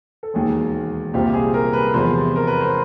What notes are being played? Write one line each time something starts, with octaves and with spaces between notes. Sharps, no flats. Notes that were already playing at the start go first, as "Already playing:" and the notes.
A4
E1 D#2 D#3 G#4
C2 A#2 G3 C4 F4 G4
G#4
A#4
B4
E2 C3 F3 G#3 C5
A#4
B4
C5